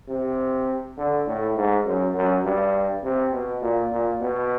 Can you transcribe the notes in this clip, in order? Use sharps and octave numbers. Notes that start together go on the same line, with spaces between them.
C3
D3
A2
G#2
F#2
F#2
G2
C3
B2
A#2
A#2
B2